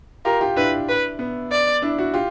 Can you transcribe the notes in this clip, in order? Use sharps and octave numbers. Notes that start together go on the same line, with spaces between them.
F4 G4 A#4
F4 G4
D4 E4 B4
B4
B3
D5
D4 E4
E4 F#4
F4 G4